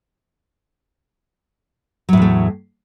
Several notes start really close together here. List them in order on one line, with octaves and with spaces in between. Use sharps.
F#3 A2 E2 A3